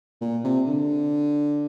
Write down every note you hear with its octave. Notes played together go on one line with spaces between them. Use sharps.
A#2
C3
D3